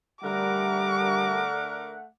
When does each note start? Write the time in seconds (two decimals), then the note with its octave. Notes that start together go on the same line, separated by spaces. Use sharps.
0.24 D3 G3 A3 A#4 F#5 D6